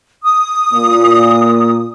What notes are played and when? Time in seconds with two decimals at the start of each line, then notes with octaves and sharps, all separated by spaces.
0.23 D#6
0.73 A#2